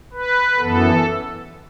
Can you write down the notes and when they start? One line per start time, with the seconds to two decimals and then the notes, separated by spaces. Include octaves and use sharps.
0.13 B4
0.58 F#2 E3 B3 A4